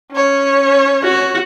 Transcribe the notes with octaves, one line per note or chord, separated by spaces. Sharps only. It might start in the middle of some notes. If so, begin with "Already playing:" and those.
C#4 C#5
F#4